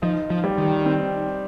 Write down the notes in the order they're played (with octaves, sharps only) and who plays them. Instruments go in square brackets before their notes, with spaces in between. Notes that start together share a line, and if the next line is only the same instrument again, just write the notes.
[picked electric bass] F3 [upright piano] D#4
[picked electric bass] F3
[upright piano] G3
[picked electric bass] D#3
[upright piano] C4